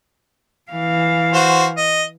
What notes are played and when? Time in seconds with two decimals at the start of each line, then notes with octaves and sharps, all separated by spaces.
0.72 E3 F5
1.33 F#4 C5
1.77 D#5